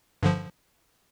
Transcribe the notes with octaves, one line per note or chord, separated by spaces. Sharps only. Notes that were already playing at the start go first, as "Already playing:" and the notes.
G2 D3 F3